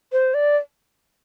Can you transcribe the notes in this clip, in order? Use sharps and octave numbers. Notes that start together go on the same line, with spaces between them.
C5
D5